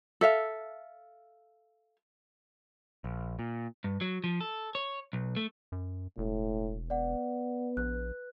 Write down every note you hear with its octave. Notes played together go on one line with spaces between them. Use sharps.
A4 E5 F5
A#1
A#2
G2
F#3
F3
A4
C#5
B1
A3
F#2
E1 A2
B3 D5 F#5
A#1 B4 F#6